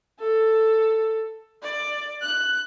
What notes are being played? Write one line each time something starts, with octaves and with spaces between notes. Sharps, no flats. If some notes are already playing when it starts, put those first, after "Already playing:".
A4
D5
F#6